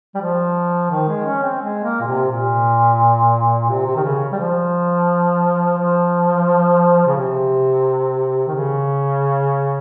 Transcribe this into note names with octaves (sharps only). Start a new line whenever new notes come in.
G3
F3
D#3
G#3
C#4
C4
G#3
A#3
A#2
C3
A#2
C3
C3
D#3
C#3
G3
F3
F3
C#3
C3
D#3
C#3